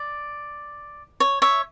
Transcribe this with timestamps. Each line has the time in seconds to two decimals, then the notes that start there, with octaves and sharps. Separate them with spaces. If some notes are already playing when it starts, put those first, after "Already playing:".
Already playing: D5
1.20 C#5
1.42 C#5 E5